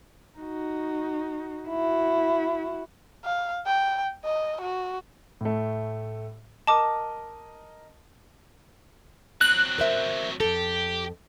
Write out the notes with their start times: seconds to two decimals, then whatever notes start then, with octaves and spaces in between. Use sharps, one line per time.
0.39 D#4 F#4
1.68 E4 F#4
3.25 F5
3.66 G5
4.25 D#5
4.61 F#4
5.41 A2 A3
6.67 A#4 D#5 A5 D6
9.41 F#3 C4 F#6
9.78 A#4 C5 E5
10.40 F2 G4 A4